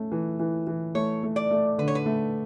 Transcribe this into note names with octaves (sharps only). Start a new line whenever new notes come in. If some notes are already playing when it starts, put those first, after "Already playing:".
Already playing: A3 C#4
E3
E3
E3
A3 C#5
A3
D5
A3
D3 B4
C#5
B4
A3